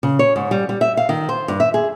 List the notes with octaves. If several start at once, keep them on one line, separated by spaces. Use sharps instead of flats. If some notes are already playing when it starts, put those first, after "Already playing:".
C#3
C#5
G#2
G3
G3
E5
F5
D#3
C5
G2
E5
G#4